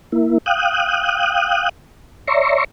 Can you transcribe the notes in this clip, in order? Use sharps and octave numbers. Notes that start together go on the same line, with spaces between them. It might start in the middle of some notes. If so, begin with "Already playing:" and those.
A#3 E4
F5 G5 D#6 F#6
C#5 D5 E5 A#5 C6 C#6